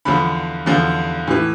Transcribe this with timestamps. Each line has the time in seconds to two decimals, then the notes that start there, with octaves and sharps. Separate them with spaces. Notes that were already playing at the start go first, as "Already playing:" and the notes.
0.05 E2 D3 F3 B5
0.66 E2 D3 F3
1.27 A2 E3